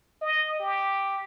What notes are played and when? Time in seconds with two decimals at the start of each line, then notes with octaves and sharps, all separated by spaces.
0.22 D#5
0.59 G4